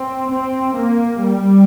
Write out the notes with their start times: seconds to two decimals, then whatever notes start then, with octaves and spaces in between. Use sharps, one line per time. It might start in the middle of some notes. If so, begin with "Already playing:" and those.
Already playing: C4
0.31 C4
0.76 A#3
1.22 G3